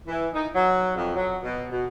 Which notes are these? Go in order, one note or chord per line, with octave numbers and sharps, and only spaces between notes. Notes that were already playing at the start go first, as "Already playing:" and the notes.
E3
D#4
F#3
F2
F#3
B2
B2